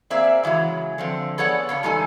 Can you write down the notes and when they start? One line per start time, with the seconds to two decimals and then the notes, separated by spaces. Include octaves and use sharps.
0.10 A#3 C4 G#4 D5 E5
0.43 C#3 E3 F#3 G#3
0.98 D3 F3 C4
1.38 B3 G#4 A4 C#5 D5 F#5
1.69 C#3 C#4 D4
1.83 E2 G3 G#3 D#4 A4 G#5